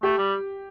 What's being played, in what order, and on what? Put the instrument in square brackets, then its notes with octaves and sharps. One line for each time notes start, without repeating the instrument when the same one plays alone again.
[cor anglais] A3 [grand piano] G4
[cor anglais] G3